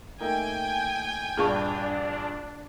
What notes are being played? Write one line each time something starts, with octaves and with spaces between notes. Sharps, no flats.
A3 A#3 D#4 G5 G#5
A#1 G2 D4 G#4 A5 C#6